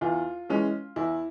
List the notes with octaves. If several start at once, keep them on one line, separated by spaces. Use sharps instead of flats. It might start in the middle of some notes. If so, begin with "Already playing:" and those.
E2 F4
E3 G#3 C#4
E2 E4